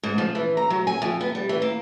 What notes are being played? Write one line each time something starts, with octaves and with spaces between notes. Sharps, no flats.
G#2
F3
E3
A#5
F#3
G#5
F2
B3
G3
E3
A#3